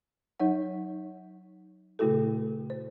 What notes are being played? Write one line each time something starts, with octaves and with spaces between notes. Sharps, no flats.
F#3 D#4 C#5 F#5
A#2 C#3 A3 E4 F#4 A4
C5